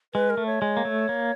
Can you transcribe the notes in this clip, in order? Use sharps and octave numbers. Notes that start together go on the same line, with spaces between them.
G#3 B4
A#4
A3
C#5
G#3
A#3
A3
A#3